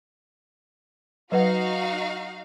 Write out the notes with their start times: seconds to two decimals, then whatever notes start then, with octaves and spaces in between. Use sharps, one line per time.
1.32 F#3 D#4 F#4 B4 F5 F#5